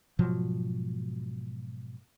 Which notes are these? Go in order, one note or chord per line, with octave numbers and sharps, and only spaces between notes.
G#2 B2 F3 F#3